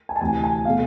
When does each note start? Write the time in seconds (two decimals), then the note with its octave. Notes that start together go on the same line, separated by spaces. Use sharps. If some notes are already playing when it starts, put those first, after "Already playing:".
0.09 G#5
0.16 A5
0.21 D2 C3 E3 G#5
0.44 G#5
0.65 B2 A3 F5